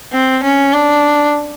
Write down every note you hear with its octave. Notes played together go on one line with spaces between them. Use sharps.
C4
C#4
D4